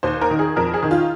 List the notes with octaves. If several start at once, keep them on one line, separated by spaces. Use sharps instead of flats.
D#2 C5
A#4
D#3
G#4
F2 A#4
G#4
D#3
F4